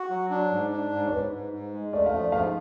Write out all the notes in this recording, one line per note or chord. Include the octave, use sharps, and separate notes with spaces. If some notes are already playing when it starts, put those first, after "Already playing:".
Already playing: F#4
F#3
D4
G#2
D4
G#2
C#5
G#2 B4
G#2
G#2
G#3
A3 D5
F5
F3
D5
G#2 F5